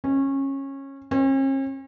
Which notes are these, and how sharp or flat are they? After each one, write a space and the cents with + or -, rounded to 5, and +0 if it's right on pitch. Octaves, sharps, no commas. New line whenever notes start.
C#4 -20
C#4 -45